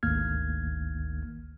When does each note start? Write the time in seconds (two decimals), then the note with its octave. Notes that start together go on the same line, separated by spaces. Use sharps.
0.03 G#1 D2 D#3 A#3 F6 G#6